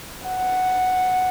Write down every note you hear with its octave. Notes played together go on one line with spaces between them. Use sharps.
F#5